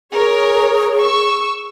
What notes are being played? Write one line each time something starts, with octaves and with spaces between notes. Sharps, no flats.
G#4 A#4 C#5
C#6 E6